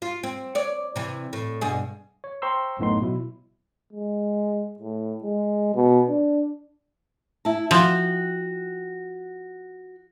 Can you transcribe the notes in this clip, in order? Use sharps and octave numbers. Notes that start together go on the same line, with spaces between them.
F4
C4
C#5 D5
C3 E3
A2
G2 B2 G#4
C#5
C5 G5 A#5 C6 C#6 E6
A1 F#2 A2 B3 D#4 C6
B2 F#3 E4
G#3
A2
G#3
B2
D4
E4 A5
F3 F#4 G5